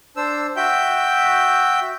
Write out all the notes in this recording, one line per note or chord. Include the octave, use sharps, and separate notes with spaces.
D4 C5 E6
F#4 E5 G5 G6